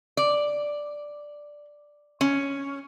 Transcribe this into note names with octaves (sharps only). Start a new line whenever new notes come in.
D5
C#4